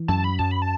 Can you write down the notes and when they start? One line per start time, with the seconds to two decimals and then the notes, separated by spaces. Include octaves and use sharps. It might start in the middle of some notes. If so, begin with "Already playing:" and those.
Already playing: E3
0.08 F#2 A5
0.24 B5
0.39 F#2 A5
0.51 B5
0.62 A5